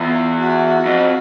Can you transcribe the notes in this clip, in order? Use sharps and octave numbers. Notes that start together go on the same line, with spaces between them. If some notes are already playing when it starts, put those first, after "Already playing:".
Already playing: E2 F4
F#4
F2